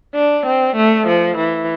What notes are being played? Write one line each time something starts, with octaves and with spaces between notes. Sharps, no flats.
D4
C4
A3
F3
E3